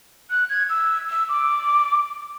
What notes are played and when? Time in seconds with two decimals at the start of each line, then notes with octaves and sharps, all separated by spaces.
0.30 F#6
0.50 G#6
0.70 E6
1.10 E6
1.29 D6